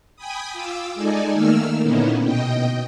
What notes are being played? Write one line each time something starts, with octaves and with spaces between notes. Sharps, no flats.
G5 G#5 B5 D#6
F4 D6 E6
G#3 D#4 A4 D5 G#5
D#3 A3 A#3 E6 F6
A#2 D3 B3 C#4 D#4 E4
B2 D#5 G5